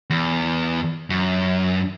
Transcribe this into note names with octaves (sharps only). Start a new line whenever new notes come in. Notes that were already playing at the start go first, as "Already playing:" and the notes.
E2
F#2